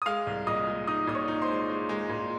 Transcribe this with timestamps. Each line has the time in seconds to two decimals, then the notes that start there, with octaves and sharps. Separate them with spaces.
0.02 D#6
0.06 G#3 F5 F6
0.27 C2
0.47 A#2 D#5 D#6
0.67 G#3
0.87 D#4 D#5 D#6
1.07 A#2 D#6
1.15 C#5 C#6
1.28 D#4
1.42 C5 C6
1.49 G#3
1.70 G#3
1.89 G#3
2.09 A#2